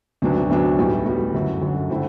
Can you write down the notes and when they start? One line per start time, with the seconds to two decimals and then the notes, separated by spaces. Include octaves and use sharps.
0.22 D2 C3 F#3 B3 D4
0.49 D2 C3 F#3 B3 D4
0.78 B1 A2 G3 B3
1.06 B1 A2 G3 B3
1.33 G1 F#2 D3
1.62 G1 F#2 D3
1.90 D3 A3 C4 E4